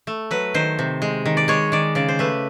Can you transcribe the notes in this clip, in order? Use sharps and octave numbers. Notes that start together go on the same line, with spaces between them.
A3
F#3 B4
D#3 C5
C3
G#3
D#3
D5
G#3 C#5
D#3 D5
C#3 D5
C5
A3 B4